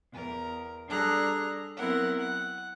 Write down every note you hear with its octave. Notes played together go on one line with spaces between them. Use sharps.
E2 A#4
G3 D4 G#4 A4 A#5 F#6
F#3 B3 C4 E4 A#4 F#5
F#5